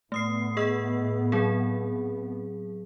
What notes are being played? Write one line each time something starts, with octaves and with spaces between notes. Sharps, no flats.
A2 A3 B3 D#6 C7
G#4 D#5 E6
F#3 C4 G#4